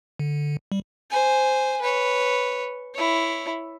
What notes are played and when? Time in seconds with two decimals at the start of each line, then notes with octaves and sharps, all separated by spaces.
0.19 D3
0.72 G3
1.11 C5 G#5
1.82 B4 C#5
2.95 E4 C#5